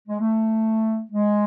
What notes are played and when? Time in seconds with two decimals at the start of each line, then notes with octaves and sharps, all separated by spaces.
0.08 G#3
0.20 A3
1.11 G#3